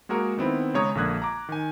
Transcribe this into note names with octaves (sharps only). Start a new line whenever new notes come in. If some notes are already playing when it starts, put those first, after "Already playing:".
G#3 A#3 F#4 G#4 A#4
D#3 B3 C4 E4
C#3 G#3 C#5 A#5 D#6
A#1 D3 A#3 D#6 F#6 G#6
A#5 D6
D#3 G#5